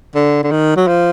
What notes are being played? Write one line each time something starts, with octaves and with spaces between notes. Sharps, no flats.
D3
D3
D#3
F#3
F3